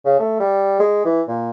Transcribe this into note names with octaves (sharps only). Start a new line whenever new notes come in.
C#3
A3
G3
G#3
E3
A#2